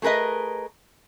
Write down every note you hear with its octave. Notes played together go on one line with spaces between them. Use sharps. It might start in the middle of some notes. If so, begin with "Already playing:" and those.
A3 G#4 A#4 B4 D#5